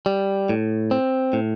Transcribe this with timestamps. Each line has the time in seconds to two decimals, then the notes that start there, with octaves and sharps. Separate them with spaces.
0.06 G3
0.49 A2
0.91 C4
1.33 A2